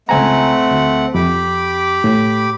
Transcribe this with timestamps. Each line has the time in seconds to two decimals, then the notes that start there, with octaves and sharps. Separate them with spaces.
0.09 C#2 A3 C4 F#5 G#5 A#5
0.71 D2
1.14 F2 G4 B5 D6
2.04 A2